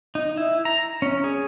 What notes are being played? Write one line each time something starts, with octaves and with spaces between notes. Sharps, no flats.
D#4
E4
A#5
C#4
G#4